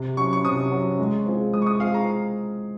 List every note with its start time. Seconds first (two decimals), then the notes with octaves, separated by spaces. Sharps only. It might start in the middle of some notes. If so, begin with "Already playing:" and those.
Already playing: C3
0.17 F#3 C#4 C#6
0.33 C#6
0.44 C3 D#6
0.71 F#3 C#4
0.99 G#3
1.26 C4 F4 G#4
1.53 G#3 D#6
1.62 C#6
1.67 D#6
1.80 C4 F4 G#4 F5
1.94 A#5